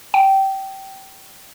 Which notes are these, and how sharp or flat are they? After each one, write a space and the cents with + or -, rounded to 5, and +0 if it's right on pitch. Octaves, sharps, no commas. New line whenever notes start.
G5 -20